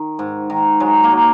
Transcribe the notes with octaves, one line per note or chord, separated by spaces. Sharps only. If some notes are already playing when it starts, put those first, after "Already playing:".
Already playing: D#3
G#2
D#3
F#3 G#3
A#3
F#3